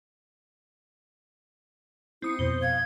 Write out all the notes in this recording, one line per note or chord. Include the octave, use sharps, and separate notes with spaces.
C4 E4 D#6 C#7
F2 B2 C5 G7
F5 G#6